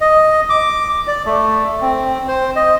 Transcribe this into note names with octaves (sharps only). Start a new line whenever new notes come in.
D#5
D6
D5
A3
C4
C5
D#5